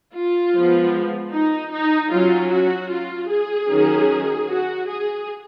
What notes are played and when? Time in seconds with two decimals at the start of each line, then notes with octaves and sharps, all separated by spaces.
0.15 F4
0.55 F3 G#3 B3
1.32 D#4
1.72 D#4
2.11 F#3 C#4 F4
2.50 F#4
2.90 F4
3.29 G#4
3.68 D#3 F#3 C#4
4.47 F#4
4.86 G#4